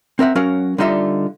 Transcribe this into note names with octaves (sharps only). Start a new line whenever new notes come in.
C4 A#4 E5 F#5
F#3 C#4 F#4 A#4 F5
D3 G3 D#4 F4 D#5 E5